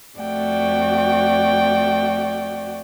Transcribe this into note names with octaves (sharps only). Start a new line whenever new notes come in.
F2 A3 F#4 D5 G5